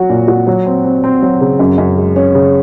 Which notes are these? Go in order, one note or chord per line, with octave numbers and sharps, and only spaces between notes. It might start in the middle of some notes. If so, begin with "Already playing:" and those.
Already playing: F#3 F#4
A#2
F#4
F#3
C4
C4
C4
F#3
C#3
F#2
F#2
G#3
C#4
C#3